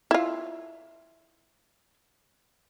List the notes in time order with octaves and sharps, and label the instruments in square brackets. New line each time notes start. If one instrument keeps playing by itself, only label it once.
[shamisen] E4 F4